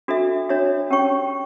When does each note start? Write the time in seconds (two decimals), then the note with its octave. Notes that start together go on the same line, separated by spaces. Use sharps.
0.08 D4 F#4 A4 E5
0.49 D4 F#4 C#5 E5
0.90 C#4 G4 C#5 G5 C#6